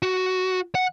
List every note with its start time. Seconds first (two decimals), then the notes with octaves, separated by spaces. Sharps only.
0.02 F#4
0.75 F#5